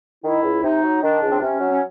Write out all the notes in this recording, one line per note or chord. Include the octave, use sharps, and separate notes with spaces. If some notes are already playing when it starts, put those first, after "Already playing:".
D#3 E4
C#2
C3 D#4
F#3
D#3 D4
C#2
C4
C3 C#4
F#3
C#4